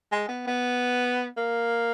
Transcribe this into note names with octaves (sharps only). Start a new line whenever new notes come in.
G#3
B3
B3
A#3